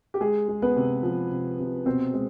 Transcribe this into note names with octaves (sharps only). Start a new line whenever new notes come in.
G4
G#3 G#4
G#3
B3 B4
C3
F3
C3
C3
B2 C4 C5
G#3